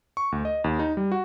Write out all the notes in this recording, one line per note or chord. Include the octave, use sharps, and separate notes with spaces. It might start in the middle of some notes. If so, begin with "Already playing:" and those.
C#6
D2
D#5
D#2
D#4
G3
F#4